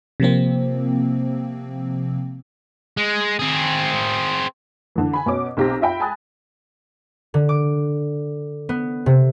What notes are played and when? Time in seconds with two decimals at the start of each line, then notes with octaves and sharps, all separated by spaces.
0.20 C3 F3 A#3 C4
2.97 G#3
3.39 C4 G#4
4.96 D3 E3
5.13 G#5 B5
5.26 B2 C#4 D6
5.57 B1 C4 G4 A#5 D6 A#6
5.81 F4 E5 G5 B5
6.00 G#5 A5 B5 D#6 F#6 A6
7.34 D3
7.49 D6
8.69 B3
9.06 C3